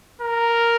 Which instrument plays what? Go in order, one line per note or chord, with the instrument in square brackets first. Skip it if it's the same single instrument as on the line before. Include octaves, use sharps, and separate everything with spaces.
[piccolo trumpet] A#4